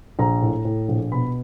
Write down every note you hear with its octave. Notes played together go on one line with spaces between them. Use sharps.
A#1 A#5
A2
A2
A#1
B2 B5